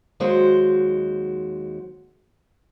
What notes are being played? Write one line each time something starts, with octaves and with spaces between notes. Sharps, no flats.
D#2 F#3 G#3 F#4 C5